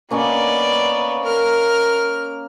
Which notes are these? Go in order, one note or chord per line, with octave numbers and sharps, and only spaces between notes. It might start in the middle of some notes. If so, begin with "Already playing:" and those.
A#3 B3 C#4 D5 D#5
A#4 F6